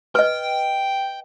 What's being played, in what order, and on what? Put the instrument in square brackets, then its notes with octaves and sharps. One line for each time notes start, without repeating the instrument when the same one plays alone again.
[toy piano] B4 D#5 [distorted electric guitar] G5